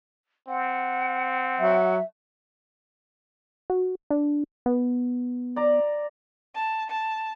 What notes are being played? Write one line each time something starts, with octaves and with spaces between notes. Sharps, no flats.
C4 F#5
F#3 E5
F#4
D4
B3
D5 A#5
A5
A5